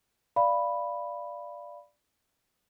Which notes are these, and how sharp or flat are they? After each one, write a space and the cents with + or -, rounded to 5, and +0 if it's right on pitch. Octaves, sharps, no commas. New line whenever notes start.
D5 +0 F5 -15 B5 +0